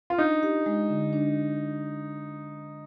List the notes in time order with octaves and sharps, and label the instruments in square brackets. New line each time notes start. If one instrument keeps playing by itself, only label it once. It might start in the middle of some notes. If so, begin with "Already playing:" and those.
[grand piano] F4
[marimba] D4 [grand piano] D#4
[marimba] G4
G#3
D3
D4